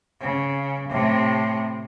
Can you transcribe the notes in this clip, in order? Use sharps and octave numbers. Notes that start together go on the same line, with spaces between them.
C#3
A2 C3